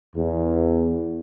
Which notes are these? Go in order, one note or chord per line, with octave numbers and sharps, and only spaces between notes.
E2